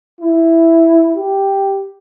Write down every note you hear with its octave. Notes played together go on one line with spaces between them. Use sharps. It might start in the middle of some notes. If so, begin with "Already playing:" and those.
E4
G4